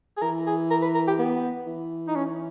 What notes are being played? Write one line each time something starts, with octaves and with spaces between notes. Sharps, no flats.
G#4
E3 A#4
G#4
A#4
B4
A#4
G4
B3
E3
D#4
C#4